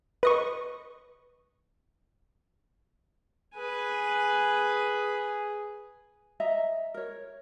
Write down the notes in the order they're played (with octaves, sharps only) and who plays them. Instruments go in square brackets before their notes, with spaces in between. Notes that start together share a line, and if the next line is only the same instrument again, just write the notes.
[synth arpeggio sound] B4 D#5 C#6
[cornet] G#4 [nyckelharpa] B4 G#5
[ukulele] D#5 E5 A#5
A#4 C#5